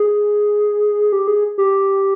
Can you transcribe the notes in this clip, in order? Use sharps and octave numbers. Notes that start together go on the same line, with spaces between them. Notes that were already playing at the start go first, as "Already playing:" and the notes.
Already playing: G#4
G4
G#4
G4